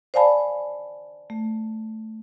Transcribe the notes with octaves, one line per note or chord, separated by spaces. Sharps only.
C5 D5 F5 G#5 A5 B5
A3